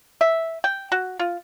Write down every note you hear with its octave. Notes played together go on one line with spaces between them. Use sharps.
E5
G5
F#4
F4